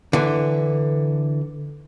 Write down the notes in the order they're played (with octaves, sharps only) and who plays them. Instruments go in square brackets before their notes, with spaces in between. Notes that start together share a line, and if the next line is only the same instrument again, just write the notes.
[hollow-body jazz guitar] D3 E3